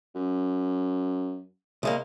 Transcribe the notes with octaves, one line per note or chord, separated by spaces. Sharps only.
F#2
C2 G#3 A#3